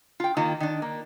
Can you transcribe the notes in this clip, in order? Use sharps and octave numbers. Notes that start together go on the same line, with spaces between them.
F4 G5
D#3 A#3 F4
D#3 D4
A#3